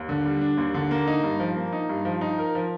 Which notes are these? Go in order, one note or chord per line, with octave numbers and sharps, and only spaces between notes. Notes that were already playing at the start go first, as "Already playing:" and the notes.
Already playing: D#2
D3
G3
D4
D#2
D3
A#3
D#4
G2
F3
A#3
D#4
G2
F3
D#4
A#4
F3